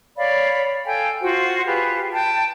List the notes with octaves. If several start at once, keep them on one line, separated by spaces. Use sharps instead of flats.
C#5 D5 F5 B5
A4 F5 G5 G#5
F4 F#4 C5 F#5
F4 G4 G#4 B4
G5 A5